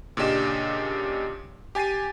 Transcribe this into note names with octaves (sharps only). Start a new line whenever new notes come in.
A#2 C#3 D4 G4 D#5 E7
G4 G#5 A6 C7 D#7